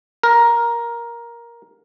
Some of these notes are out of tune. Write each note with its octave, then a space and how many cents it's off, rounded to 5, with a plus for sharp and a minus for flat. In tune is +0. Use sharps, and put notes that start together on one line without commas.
A#4 +10